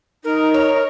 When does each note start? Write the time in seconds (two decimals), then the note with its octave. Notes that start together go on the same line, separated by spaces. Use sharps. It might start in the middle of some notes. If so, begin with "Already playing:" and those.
0.24 D#4 A#4
0.54 C#5